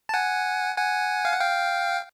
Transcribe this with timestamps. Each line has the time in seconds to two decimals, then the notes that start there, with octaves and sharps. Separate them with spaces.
0.09 A5
0.14 F#5 G#5
0.77 F#5 G#5
1.25 F5
1.32 F#5
1.40 F5 G5